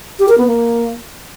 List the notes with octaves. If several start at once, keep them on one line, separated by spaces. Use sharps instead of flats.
G4
A#4
B3
A#3